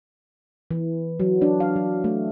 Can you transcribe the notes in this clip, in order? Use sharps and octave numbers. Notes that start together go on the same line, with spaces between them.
E3
F#3
D4
F5
F#3
A3